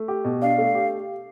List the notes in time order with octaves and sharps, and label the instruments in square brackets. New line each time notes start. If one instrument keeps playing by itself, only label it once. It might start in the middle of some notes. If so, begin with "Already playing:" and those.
Already playing: [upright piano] A3
G4
B2
[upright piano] D4 [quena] F5
[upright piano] A3
G4